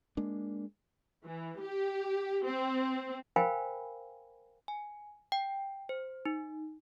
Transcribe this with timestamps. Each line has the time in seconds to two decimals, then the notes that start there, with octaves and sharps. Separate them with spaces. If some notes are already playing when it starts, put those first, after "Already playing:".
0.17 G#3 A#3 D4
1.25 E3
1.63 G4
2.46 C4
3.36 A#4 C5 F5 G5 G#5 B5
4.68 G#5
5.32 G5
5.89 C5
6.26 D#4